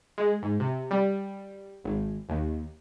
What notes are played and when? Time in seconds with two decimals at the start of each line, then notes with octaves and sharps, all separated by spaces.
0.18 G#3
0.43 G#2
0.60 C3
0.91 G3
1.84 G#1
2.29 D#2